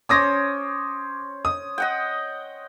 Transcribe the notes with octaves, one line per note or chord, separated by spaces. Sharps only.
C#4 C5 C#5 D6 D#6 A#6
D#6
D#5 F#5 G5